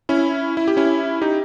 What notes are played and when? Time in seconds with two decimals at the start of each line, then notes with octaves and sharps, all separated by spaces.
0.09 C#4 E4
0.57 E4
0.68 G4
0.77 C#4 E4
1.21 D#4 G4